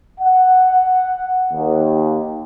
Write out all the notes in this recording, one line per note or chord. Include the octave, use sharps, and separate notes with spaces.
F#5
D#2